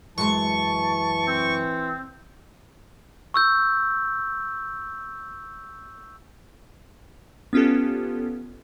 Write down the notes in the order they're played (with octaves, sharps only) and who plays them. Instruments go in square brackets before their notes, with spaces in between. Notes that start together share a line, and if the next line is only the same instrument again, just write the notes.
[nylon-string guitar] F#2 G#3 [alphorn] E3 [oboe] A5 [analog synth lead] C#6
[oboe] C4
[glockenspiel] C#6 E6 G6
[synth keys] B3 C#4 F4 G4 A4